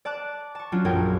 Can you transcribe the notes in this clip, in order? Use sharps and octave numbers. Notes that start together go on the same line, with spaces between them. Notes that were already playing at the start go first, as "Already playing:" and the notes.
D5 A5 D6 F#6
A5 C#6
F#3 C#4 D4 F4
A#1 F#2 G#4 A#4 G5 G#6